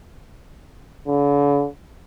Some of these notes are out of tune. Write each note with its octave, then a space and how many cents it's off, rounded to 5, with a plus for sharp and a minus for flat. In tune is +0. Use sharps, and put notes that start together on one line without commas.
D3 -45